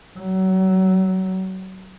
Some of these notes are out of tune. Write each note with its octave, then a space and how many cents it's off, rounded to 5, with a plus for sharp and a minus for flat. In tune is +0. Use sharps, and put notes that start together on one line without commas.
F#3 +30